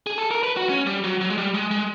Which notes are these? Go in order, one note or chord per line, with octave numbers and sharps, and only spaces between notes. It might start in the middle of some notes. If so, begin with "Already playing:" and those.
G#4
A4
A#4
B4
F#4
C#4
G3
F#3
F#3
G#3
G3
G#3
G#3